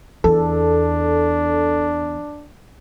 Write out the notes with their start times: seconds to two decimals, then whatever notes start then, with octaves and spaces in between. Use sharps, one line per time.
0.24 E2 D4 A4